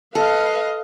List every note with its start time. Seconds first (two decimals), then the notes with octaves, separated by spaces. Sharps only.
0.15 A4 B4 D#5 F5